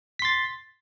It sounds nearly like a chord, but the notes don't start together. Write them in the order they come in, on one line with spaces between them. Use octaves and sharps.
B6 C6 A6